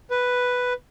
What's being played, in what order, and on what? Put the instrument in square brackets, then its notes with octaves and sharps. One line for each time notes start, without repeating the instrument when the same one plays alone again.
[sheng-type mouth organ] B4